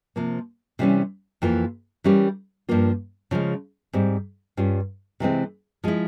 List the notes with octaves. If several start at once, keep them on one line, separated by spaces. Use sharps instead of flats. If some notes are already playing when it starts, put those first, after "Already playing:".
C3 F3 A#3
C3 E3 G3 C#4
F2 E3 A#3 F4
E3 G3 C#4 G4 A#4
G2 F3 A#3 F4
C#3 F3 G#3
G#2 G3 C4
G2 G3 C#4 F4
C3 E3 G#3 C4
F3 G#3 E4